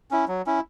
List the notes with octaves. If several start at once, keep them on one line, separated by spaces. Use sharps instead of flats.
C#4 E4
F#3
C#4 E4